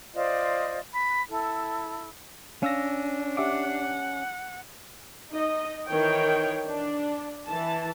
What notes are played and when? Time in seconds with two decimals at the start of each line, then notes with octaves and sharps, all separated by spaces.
0.14 F4 C5 D5 D#5
0.93 B5
1.29 E4 A4
2.63 C#4 D4 F5 E6 A#6
3.37 G4 E5 F#5 D6
5.30 D#4 D#5
5.87 D#3 E3 C#5 G5
6.67 D4
7.48 E3 A5